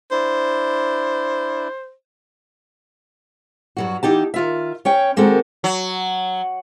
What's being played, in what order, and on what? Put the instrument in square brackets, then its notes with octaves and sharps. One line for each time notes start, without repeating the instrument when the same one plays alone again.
[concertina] D4 E4 [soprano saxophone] C5
[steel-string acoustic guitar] G2 F#3 F#4
E3 D#4 G4 A5
D#3 F4 E5
C#4 C#5 G5
D#3 G#3 A#3 C4 F#4 A4
[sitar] F#3